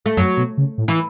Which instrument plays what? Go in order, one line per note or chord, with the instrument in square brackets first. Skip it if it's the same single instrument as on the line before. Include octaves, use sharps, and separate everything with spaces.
[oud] A3
[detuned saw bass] F#2 [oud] F#3
[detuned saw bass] B2
C#3
A2
[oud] E3